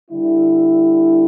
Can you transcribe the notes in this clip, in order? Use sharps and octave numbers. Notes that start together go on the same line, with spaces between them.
D3 G3 E4